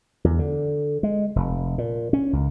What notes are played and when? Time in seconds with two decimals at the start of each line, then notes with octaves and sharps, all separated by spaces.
0.24 E2
0.39 D3
1.03 G#3
1.36 F1
1.78 A#2
2.13 C#4
2.33 C#2